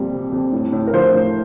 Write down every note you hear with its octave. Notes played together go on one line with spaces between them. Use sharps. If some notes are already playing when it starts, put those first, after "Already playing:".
Already playing: F2 A#2 G3
C3
F2
A2
A2
A#4
F3 C5
A2